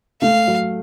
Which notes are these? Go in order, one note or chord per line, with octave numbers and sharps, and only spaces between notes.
A3 F5
F#3